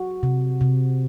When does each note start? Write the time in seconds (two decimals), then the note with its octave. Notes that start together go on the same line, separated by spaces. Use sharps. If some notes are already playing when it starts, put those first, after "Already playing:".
Already playing: F#4
0.23 C3
0.61 C3